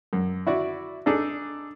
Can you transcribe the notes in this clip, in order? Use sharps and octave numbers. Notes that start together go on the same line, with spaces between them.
F#2
E4 F#4 D5
D4 D#4 G#4 A4